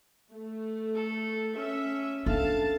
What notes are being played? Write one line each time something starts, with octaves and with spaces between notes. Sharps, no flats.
A3
A4
C#4 E5
C#4 D4 A4 E5 F5 A5